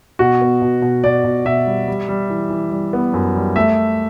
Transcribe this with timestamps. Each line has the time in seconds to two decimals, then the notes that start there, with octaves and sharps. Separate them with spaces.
0.19 B2 F#4
0.41 B3
0.62 B2
0.82 B2
1.04 B2 D5
1.24 B2
1.45 B2 E5
1.66 G3
1.88 G3
2.08 G3
2.30 E3
2.50 E3
2.72 G3
2.93 B3
3.13 F#2
3.35 G3
3.56 A3 E5